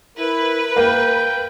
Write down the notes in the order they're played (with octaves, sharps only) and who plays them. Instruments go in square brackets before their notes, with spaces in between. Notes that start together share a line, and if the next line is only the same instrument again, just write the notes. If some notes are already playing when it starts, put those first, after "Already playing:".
[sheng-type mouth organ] E4 [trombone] A#4 [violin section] B4
[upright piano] A#3 [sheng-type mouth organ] G5